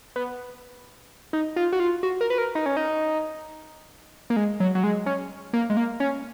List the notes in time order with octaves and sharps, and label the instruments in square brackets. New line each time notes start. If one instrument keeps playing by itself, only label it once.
[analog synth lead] B3
D#4
F4
F#4
F4
F#4
A#4
B4
A#4
D#4
C#4
D#4
A#3
G#3
F#3
F#3
G#3
C#4
A#3
G#3
A#3
C#4